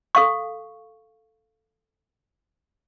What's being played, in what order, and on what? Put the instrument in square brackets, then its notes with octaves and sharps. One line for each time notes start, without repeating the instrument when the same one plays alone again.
[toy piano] A4 F5 C#6